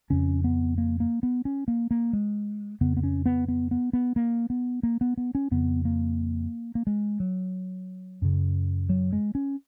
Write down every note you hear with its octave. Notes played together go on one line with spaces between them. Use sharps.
F2 C#3 C#4
B3
A#3
A#3
B3
C#4
A#3
A#3
G#3
F2 C#3 B3
B3
C#4
B3
B3
B3
B3
A#3
B3
A#3
B3
B3
C#4
F2 C#3 B3
A#3
A#3
G#3
F#3
F#2 C#3
F#3
G#3
C#4